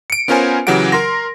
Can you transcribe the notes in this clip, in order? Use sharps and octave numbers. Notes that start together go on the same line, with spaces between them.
C#7 D7
B3 C#4 F4 A#4 C5 G#5
C#3 E3 F#3 G4 F#5 D7
A#4 C6 A#6